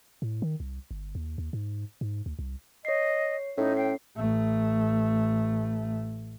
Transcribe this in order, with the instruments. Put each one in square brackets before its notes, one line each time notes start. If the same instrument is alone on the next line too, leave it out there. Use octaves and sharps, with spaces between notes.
[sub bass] A2
D#3
C2
G1
D#2
D#2
G#2
G#2
D2
C2
[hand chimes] C#5 C7 [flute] D#5
[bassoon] A2 [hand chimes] C#4 [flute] D#4
[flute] G5 [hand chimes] C7
[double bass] A1 A3